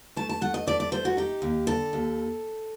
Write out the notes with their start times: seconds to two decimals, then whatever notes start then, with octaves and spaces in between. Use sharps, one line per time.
0.16 A3 A5
0.29 A5
0.41 A3 F#5
0.54 D#5
0.67 A3 D5
0.80 D5
0.92 A3 C5
1.05 F#4
1.17 D#4 G4
1.42 D#2
1.67 D3 A4
1.93 D#2